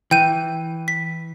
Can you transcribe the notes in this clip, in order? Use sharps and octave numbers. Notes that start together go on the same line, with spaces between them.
E3 G5 G6 D#7
B6